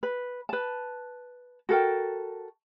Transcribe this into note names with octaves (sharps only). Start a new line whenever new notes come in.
B4
B4 A5
F#4 A4 A#4 G5